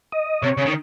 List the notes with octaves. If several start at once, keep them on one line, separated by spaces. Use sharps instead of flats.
D#5
C3 C#5
C#3
D#3